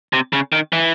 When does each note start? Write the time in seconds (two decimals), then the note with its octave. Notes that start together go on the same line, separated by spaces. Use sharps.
0.13 C3
0.33 C#3
0.53 D#3
0.73 E3